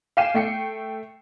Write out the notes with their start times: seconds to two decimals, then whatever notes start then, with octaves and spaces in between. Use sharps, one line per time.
0.17 F5 G5 G#5 C7 D#7 E7
0.34 A3 G5 C7 C#7